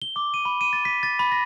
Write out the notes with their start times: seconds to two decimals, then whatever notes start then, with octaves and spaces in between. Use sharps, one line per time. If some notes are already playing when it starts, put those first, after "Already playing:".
0.02 G7
0.16 D6
0.34 D#7
0.45 B5
0.61 D#7
0.73 A6
0.85 B6
1.03 A6
1.19 B5
1.31 A#6